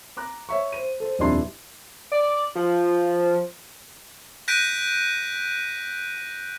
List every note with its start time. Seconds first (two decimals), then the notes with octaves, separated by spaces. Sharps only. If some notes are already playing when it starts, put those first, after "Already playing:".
0.17 A#5 D6 F#6
0.49 C#5 E5 C#6
0.73 C5 D#7
1.00 A4 C5
1.19 D#1 F2 G3 D4 E4 C6
2.12 D5
2.55 F3
4.48 F#6 G6 A#6 B6 D7 D#7